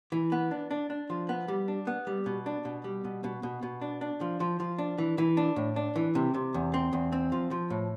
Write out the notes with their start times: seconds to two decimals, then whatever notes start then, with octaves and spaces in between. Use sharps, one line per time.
0.12 E3
0.32 B3
0.51 D4
0.71 D4
0.90 D4
1.10 F3
1.29 B3
1.48 G3
1.68 D4
1.87 B3
2.07 G3
2.26 B2
2.46 D4
2.65 B2
2.84 G3
3.05 B2
3.24 B2
3.43 B2
3.63 B2
3.82 D4
4.01 D4
4.21 F3
4.40 F3
4.60 F3
4.78 D4
4.98 E3
5.18 E3
5.37 D4
5.56 A2
5.76 D4
5.96 E3
6.15 C3
6.34 C3
6.54 E2
6.74 C4
6.93 E2
7.12 C4
7.32 F3
7.51 F3
7.70 A2